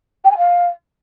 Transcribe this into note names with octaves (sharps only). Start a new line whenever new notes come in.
G5
G#5
F5